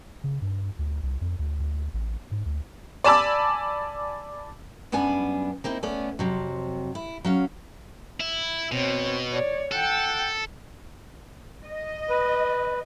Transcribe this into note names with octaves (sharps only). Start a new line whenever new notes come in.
C#3
G2
D2
C2
F2
D2
D2
A1
G#2
D2
D5 G#5 A5 B5 D6 E6
F#2 G3 B3 D4 G#5
A#3 C4 D#4 E4
A3 B3 C#4 D5
F2 C3 F#3
E4
F#3 C#4 F5
E4
B2 C4 C#5
C#5 D5
A4 F#5 G5
D#5
B4